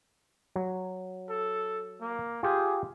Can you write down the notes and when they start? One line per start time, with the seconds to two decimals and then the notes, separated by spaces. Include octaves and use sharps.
0.56 F#3
1.30 A4
2.01 A#3
2.43 F4 G4 G#4